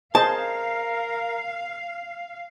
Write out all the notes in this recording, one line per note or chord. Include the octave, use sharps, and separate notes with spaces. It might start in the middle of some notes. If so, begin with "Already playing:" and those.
G#4 A#4 C5 D#5 F5 A5